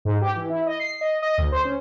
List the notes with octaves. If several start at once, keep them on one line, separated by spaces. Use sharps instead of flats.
G#2
G4
E3
E4
D#5
C7
D#5
D#5
D2
C5
C#4